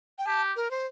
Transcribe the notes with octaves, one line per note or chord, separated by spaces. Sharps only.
G5
G4 A5
A#4
C5